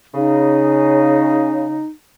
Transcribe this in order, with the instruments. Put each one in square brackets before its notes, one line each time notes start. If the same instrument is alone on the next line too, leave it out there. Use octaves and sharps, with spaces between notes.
[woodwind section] C#3 [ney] D#4